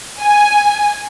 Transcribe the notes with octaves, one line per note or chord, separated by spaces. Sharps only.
G#5